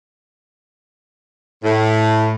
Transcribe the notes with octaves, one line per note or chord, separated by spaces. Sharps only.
A2